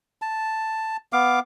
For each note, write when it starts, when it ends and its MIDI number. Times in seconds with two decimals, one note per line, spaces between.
0.22 0.97 81
1.13 1.40 59
1.13 1.40 77
1.13 1.40 86